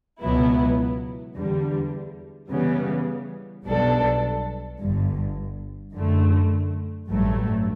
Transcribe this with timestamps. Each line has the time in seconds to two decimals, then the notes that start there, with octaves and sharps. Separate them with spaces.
0.20 C#2 B2 F#3 B3 E4
1.35 E2 D3 G3
2.50 C#3 E3 G3 B3
3.64 B1 B2 G3 D4 A4
4.79 G1 G2 D3
5.93 F#2 D3 A3
7.08 A1 G2 F#3 A3